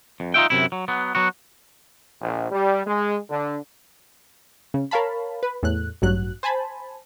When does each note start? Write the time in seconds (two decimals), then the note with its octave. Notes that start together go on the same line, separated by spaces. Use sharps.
0.20 F2
0.34 D#4 F4 E5 G5
0.50 F#2 C3 E4
0.72 F#3
0.88 F#3 B3
1.15 F#3 B3 F#4
2.21 A#1
2.50 G3
2.86 G#3
3.29 D3
4.74 C#3
4.91 A#4 C#5 F5 A5 B5
5.43 B4
5.63 E2 A2 F#6
6.02 A1 G2 F#3 F#6
6.43 C5 G#5 A5 B5